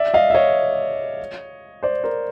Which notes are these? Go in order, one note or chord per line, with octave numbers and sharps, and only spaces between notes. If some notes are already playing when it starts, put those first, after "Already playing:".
Already playing: D5 E5
D#5 F5
E5
C#5 D#5
C5 D5
A#4 C5